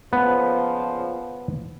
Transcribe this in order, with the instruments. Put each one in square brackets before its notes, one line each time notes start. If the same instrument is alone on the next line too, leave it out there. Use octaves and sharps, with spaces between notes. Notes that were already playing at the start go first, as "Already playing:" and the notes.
[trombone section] A#2 C#3 F3 [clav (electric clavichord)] B3